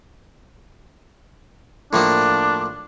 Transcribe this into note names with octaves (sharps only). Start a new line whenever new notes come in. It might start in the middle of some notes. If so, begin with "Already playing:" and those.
A2 F3 A#3 D4